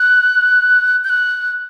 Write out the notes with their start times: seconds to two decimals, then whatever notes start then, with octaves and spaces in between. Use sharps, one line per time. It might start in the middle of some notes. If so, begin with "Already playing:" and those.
Already playing: F#6
1.04 G6
1.10 F#6